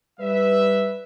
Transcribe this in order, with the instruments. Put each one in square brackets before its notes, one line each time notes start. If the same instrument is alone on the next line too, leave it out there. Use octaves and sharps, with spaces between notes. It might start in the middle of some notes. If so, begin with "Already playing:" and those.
[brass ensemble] G3 B4 E5